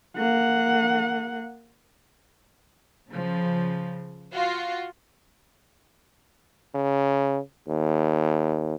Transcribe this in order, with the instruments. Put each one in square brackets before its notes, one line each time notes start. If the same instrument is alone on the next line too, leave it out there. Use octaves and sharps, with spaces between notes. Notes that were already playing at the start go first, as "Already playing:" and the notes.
[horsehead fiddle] A#3 F#5
[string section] C#3 F3
F4 F#4
[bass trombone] C#3
D#2